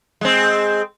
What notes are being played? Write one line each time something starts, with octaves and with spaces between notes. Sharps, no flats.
G#3 C4